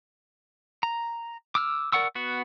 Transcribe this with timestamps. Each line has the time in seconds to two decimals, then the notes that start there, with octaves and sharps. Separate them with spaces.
0.83 A#5
1.55 D6 E6 F6
1.92 A#4 D5 F#5 C#6 E6
2.15 B3 F#4